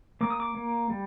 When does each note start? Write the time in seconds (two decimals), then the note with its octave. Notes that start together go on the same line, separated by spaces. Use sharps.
0.21 A#3 D6
0.30 D#6
0.40 D6
0.55 A#3
0.90 G3